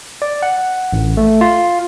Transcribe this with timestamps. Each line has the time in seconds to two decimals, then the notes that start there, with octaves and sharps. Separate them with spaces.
0.22 D5
0.42 F#5
0.93 A1
1.17 A3
1.41 F4